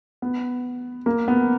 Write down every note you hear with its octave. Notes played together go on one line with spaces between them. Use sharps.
B3
A#3
B3